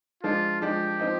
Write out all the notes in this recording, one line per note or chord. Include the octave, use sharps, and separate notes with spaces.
F3 G#3 D4 F4
F3 G#3 D4 G4
F3 C4 D#4